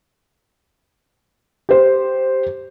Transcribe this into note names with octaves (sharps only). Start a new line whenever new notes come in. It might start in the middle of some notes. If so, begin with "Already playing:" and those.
G4 C5